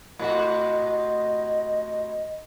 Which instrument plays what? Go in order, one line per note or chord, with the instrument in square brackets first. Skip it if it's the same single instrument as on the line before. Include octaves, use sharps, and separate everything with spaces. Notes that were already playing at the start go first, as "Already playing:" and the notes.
[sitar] A2 C3 F#4 [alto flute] D#5